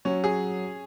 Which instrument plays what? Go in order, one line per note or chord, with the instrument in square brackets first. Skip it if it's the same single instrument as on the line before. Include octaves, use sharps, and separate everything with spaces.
[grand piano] F#3 [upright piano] C#4
[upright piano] G#4